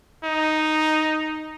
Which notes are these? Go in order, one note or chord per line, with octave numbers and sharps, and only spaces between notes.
D#4